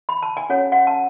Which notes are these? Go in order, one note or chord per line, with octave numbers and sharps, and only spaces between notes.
B5
A5
G#5
C#4 F#4 A4 C#5 F#5
F#5
A5